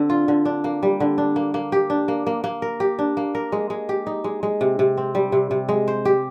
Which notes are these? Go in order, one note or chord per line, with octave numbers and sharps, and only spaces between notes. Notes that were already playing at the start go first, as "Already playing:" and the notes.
Already playing: D3 C4
F4
D3
D4
A#3
G3
D3
D4
A#3
A#3
G4
D4
A#3
A#3
A#3
A#4
G4
D4
A#3
A#4
G#3
G#3
G4
D#4
G#3
G#3
C3
C3
C4
G3
C3
C3
G#3
C5
G4